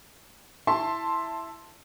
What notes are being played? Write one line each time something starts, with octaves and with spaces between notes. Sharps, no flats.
E4 E5 A5 C6